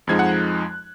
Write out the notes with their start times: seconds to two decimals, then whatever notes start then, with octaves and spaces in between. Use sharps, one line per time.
0.07 F2 F3 G#3 D#4 G#6
0.19 F#5 F#6